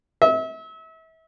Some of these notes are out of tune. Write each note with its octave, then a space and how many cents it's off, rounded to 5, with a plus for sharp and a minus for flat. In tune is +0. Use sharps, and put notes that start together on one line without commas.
E5 -35